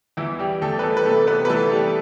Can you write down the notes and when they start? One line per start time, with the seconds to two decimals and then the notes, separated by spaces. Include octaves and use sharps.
0.17 E2 E3 E4
0.39 G3 G4
0.62 E2 A3 A4
0.79 B4
0.83 A3 A4
0.97 B4
1.05 C3 A3 A4
1.27 B3 B4
1.45 B4
1.50 E3 A3 A4
1.72 G3 G4